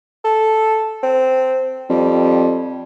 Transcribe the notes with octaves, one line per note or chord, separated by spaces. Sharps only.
A4
C4
F2 G3